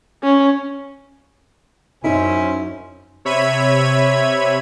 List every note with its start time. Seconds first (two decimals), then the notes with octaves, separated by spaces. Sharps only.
0.23 C#4
2.04 F#2 C#4 D#4 E4 C5 G#5
3.25 C3 C#5 E5 B5 G#6 D#7